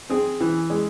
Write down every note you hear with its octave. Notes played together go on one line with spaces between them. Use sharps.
C4 G#4
E3
G#3